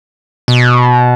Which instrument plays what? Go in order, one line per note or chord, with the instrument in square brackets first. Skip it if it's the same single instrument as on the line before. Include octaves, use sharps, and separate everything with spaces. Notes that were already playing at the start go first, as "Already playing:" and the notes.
[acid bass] B2